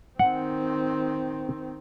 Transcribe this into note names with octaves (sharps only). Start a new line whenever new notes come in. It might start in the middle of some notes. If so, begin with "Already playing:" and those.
D#3 C4 F#5